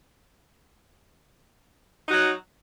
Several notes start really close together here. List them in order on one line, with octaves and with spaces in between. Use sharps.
D#4 F#4 F#3